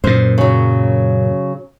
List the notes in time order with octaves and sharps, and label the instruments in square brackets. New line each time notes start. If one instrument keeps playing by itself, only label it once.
[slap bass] F#2 A#2 [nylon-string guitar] C5
[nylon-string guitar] C#3 F#3